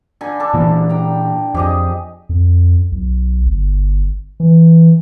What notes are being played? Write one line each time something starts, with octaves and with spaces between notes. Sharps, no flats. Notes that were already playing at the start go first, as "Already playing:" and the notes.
D3 G#5 B5
D4 A4
A#2 E3
G5 A#5
F2 G4 G#4 D#5
F2
B1
G1
E3